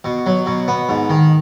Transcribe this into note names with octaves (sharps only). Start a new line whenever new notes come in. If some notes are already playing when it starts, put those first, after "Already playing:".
B2
F#3
B2
B3
G#2
D#3